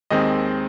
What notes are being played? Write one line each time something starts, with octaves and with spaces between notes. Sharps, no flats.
D#2 D#3 G#3 C4 D#5